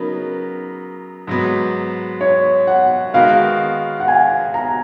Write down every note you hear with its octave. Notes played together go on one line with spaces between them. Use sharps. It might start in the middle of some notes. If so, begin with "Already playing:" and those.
Already playing: C#3 F#3 B3 D#4 A#4
G#2 F#3 B3
C#5
F#5
D#3 G#3 B3 F#4 A#4 F5
F#5
G#5
A#5